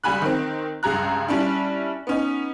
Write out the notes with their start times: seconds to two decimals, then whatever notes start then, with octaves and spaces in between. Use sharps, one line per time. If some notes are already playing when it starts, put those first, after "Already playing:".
0.04 C#2 G3 G#5 B5 F#6
0.22 D#3 C4
0.83 C#2 G2 G#4 A#5 F#6
1.28 G3 C#4 D4 E4
2.07 B3 C#4 D#4